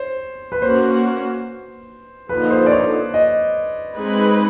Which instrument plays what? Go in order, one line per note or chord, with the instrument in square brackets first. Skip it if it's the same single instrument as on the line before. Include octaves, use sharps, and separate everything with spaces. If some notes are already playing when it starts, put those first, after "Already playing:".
Already playing: [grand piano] C5 C#5
B4
[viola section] A#3 C#4 F#4 [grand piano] C5
[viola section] D3 F3 A#3 D#4 [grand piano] B4
[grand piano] C5
D5
C#5
D#5
[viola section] G#3 C4 D#4 G#4 B4